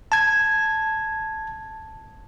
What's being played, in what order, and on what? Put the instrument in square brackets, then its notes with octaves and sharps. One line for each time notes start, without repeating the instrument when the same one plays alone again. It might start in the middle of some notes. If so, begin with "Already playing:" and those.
[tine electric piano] A5 G#6